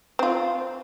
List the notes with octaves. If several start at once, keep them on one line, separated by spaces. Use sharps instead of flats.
C4 F4